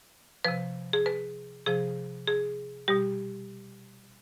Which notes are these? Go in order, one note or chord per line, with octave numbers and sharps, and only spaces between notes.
C3 F3 B4
G#4
B4
C3 F3 G#4
G#4
B2 G3 G4